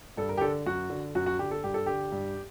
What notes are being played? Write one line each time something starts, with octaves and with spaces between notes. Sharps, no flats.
G2 A4
A#4
G4
D3 A4
F#2 F#4
D3
F#2 F#4
F#4
D3 G4
A4
G2 G4
A4
D3 G4
G2